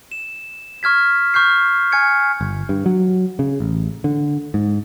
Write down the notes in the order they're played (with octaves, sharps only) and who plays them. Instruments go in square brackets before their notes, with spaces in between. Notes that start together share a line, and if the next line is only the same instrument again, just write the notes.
[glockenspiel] E7
C#6 F6 G#6 B6
C#6 F6 G6 C7
G#5 F6 G#6 C#7
[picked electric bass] G1
G2
F#3
C#3
A1
D3
G#2